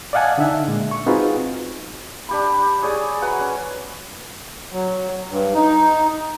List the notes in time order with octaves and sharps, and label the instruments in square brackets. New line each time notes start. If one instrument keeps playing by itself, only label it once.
[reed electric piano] D5 D#5 F5 F#5 G#5 A5
D3 D4 D#4 E5
A#2 G#3
C#6
C4 D#4 F4 F#4 G#4 B4
[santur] D4 G4 B5
G#4 C#5 D5 G#5
F#4 B4 F#5 A#5
C#4
[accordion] F#3
G2
D#4